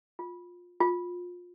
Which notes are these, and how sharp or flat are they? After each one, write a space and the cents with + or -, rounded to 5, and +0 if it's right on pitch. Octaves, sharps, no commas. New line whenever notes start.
F4 +20
F4 +25